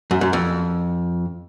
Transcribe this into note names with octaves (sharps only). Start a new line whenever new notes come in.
F#2
F#2
F2